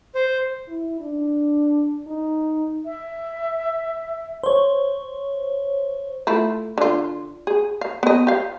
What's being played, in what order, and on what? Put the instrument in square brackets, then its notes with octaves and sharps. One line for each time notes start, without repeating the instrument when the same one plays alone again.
[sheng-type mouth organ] C5
[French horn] E4
D4
D#4
[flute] E5
[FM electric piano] C5 C#5
[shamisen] A3 E4 F4
D3 F4
G#4
F5
B3 D#5
G4 F5